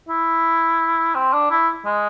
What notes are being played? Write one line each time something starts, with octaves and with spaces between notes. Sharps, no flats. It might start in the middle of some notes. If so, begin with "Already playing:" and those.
E4
C4
D4
E4
G#3